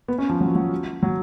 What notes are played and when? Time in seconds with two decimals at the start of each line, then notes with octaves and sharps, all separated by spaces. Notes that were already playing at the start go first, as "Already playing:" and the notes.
0.08 B3
0.18 C#4
0.29 F3
0.41 F#3
0.55 F#3
1.03 F#3